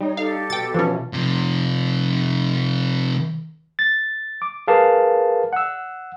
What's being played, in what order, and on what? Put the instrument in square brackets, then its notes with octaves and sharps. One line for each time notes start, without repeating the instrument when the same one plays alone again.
[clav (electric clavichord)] G3 [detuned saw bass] D#4 [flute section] C#5
[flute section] G4 A4 [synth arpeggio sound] F5
[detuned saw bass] B2 [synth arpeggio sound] G5 A6
[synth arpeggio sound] E3 C#4 [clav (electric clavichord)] F3 A5
[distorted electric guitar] C3 F3
[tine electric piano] A6
D6
G#4 A#4 B4 F5 A5
F#5 E6